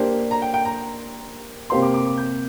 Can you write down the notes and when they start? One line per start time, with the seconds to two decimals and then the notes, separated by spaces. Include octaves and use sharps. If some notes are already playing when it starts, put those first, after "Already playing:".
Already playing: A#3 D4 G4 C5
0.31 A#5
0.42 G5
0.54 G5
0.65 A#5
1.70 C3 A#3 G4 C5 F5 C6
1.82 D6
1.94 D6
2.06 D6
2.17 G6